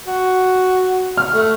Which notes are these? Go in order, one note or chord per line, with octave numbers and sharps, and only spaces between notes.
F#4
F6
A3